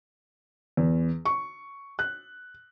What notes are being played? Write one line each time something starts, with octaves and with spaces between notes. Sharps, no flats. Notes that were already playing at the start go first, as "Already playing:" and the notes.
E2
C#6
F#6